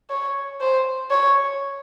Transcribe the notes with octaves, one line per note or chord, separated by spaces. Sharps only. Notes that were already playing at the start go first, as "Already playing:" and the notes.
C#5
C5
C#5